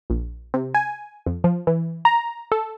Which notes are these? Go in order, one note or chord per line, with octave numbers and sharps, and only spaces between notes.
A#1
C3
G#5
F2
F3
E3
A#5
A4